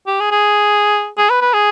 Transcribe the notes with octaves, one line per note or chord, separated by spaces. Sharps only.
G4
G#4
G#4
G#4
B4
B4
G#4